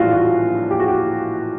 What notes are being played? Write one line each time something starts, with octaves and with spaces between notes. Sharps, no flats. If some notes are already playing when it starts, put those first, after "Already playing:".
Already playing: A#1 A2 E3 G3 F4 F#4
F#4
G4
F#4
G4